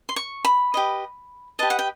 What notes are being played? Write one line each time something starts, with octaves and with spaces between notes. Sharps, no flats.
C6
C#6
B5
G4 B4 D#5
G4 B4 D#5 A5
F#5
G5